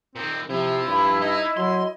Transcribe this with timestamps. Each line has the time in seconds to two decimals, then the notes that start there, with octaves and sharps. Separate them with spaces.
0.16 A#2 D#3 C4
0.49 C3 F3 E4
0.87 G2 B5
1.22 D#4 D#5
1.57 F#3 C6